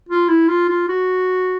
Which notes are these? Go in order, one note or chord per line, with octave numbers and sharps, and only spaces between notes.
F4
E4
F4
F4
F#4